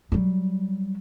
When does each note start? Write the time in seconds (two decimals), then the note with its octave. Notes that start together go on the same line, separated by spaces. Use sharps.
0.12 F#3 G3